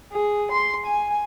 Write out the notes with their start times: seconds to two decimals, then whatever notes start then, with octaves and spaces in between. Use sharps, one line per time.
0.13 G#4
0.52 C6
0.86 G#5